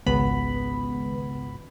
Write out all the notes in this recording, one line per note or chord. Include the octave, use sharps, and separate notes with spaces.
G#1 C#2 B3 B5